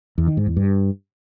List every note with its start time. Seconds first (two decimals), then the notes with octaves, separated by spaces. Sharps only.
0.18 E2
0.27 D#3
0.37 G#2
0.47 E2
0.57 G2